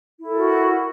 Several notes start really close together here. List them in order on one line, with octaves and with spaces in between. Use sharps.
E4 A4 A#4 F#4